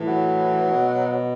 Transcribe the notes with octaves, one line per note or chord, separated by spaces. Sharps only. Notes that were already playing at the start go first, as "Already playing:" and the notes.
Already playing: A2 E3
F#3
B2